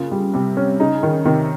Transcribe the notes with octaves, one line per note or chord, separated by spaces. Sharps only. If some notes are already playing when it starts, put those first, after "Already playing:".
Already playing: C#3 A#3 F4
G3
C3 G3
C#4
C#3 D#4
D#3
C3 D#3